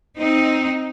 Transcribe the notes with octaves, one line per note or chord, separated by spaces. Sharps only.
C4 D#4